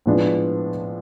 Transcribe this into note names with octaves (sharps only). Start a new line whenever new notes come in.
A2 F3 G#3 B3 D4